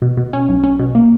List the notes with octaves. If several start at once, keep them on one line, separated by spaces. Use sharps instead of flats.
B2
B2
C#4
B1
C#4
B2
A#3